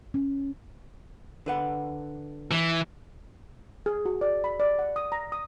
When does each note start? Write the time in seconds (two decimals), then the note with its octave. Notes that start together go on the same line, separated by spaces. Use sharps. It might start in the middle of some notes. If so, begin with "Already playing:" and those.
0.14 C#4
1.46 D3 B4 F#5
2.51 E3
3.86 G#4
4.05 F#4
4.21 D5
4.44 B5
4.60 D5
4.79 F#5
4.96 D#6
5.12 A#5
5.32 D#6